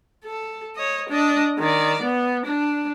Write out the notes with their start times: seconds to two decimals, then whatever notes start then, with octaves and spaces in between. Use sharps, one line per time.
0.25 A4
0.76 C#5 D#5
1.09 D4 D#5
1.59 D#3 D5
2.02 B3
2.46 D4